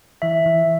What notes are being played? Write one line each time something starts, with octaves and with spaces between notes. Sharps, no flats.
E3 E5
E3